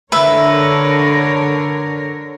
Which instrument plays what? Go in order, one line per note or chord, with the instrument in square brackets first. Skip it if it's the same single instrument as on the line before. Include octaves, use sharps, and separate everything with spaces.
[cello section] D3 A#4 C#5 [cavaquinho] B4 E5